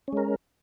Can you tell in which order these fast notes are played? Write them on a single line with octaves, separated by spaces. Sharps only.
C#4 G#3 A#4